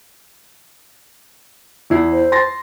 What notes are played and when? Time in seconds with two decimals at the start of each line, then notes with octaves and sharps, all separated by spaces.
1.90 E2 E4 C7
2.12 C5
2.32 C6 A6 A#6